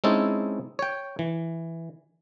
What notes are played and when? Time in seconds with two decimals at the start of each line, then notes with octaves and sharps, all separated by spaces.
0.04 G#3 C4 C#4 D#4 E4 A4
0.79 C#5 G5
1.19 E3